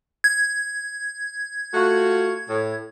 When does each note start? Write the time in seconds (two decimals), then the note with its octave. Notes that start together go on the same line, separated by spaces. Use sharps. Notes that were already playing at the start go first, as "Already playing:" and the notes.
0.24 G#6
1.74 A3 F4 F#4
2.50 A2